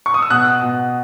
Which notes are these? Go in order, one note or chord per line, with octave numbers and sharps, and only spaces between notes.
C#6
D#6
E6
B2 D#6 F#6
B2